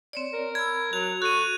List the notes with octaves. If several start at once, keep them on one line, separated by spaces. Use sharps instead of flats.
C4 C#5 D5
A#4
B5 E6 G#6
F#3 F#4 F7
F#4 A4 F#6 D#7